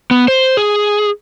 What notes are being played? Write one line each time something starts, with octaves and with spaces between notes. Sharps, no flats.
B3
C5
G#4